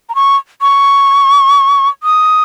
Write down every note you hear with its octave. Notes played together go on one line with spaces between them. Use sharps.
A#5
C#6
C#6
D#6